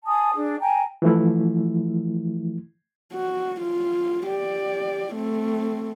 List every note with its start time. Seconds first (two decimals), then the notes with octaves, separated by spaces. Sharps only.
0.05 G#5 A5 D#6
0.34 D4 G#4
0.60 G5 G#5 A#5
1.02 E3 F3 A3 E4
3.13 F#4
3.61 F4
4.26 G4 D5
5.14 A3 C4